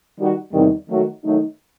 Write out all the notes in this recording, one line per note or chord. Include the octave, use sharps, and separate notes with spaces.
D#3 G3 D#4 F#4
E2 C3 D#3 G3 D#4
D#3 F#3 A3 D#4 F#4
D#3 F#3 A3 D#4